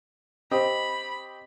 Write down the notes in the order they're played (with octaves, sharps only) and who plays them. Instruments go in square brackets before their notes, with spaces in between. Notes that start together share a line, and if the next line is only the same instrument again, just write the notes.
[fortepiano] C4 G4 D#5 [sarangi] B5